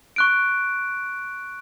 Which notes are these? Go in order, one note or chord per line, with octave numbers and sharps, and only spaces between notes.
C#6 F#6 D7